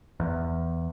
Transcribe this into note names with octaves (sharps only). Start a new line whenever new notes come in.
E2